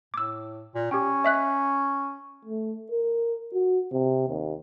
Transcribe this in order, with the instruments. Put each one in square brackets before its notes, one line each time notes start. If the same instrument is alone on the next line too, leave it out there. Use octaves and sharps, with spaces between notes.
[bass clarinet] A2 [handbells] D6 E6
[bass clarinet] A#2
[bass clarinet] C#4 [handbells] G4 G5
[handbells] D#5 E5 F#6
[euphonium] A3
A#4
F#4
C3
D#2